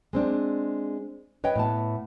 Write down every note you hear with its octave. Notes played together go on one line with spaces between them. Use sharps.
G#3 C4 D4
B4 C#5 D#5 G5
A2 B3 A5